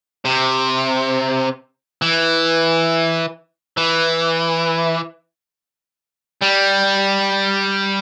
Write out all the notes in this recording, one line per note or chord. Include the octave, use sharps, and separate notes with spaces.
C3
E3
E3
G3